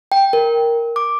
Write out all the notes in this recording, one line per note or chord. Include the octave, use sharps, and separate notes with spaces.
G5
A#4
D6